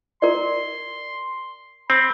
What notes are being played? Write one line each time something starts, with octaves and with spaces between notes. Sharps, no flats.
A#4 D5 C6
C4 B5